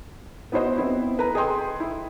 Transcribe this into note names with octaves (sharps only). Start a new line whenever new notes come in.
B3 E4 F#4 C5 D#5
B3 C4 E4
A4 B4 A#5
G#4 A4 D#5 G5 C6
E4